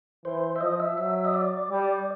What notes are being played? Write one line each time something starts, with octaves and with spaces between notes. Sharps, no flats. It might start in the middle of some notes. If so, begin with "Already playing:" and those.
E3 C5
E5
F3 D#5
E5
F#3 E5
D#5
D5
G3